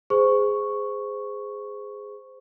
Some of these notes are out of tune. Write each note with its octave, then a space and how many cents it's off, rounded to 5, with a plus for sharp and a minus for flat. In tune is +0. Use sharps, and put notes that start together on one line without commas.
G#4 +0 C5 -20 C#6 +0